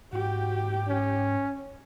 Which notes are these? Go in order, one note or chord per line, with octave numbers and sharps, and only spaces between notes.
G#2 F#4 G4 G5
C#4